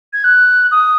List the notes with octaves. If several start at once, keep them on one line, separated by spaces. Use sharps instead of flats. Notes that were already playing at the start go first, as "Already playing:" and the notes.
G#6
F#6
D#6